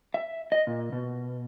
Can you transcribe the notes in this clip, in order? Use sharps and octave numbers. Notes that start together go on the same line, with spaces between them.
E5
D#5
A#2
B2